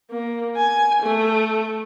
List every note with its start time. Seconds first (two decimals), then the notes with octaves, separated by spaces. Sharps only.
0.11 A#3
0.57 G#5
1.03 A3